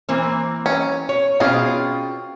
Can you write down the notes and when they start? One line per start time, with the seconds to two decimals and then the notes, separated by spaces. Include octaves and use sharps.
0.09 E3 A#3 C4
0.66 C#4
1.09 C#5
1.40 B2 C4 C#4 F4 G#4